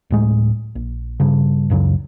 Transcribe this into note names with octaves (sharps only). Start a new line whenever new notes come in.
D1 A2 G#3
A#1
G2 C#3
C#2 F#2 C#3 F#3